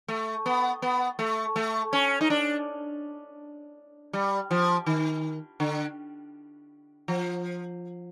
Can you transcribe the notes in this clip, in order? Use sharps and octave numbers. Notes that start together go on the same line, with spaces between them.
A3
B3
B3
A3
A3
C#4
D#4
D4
G3
F3
D#3
D3
F3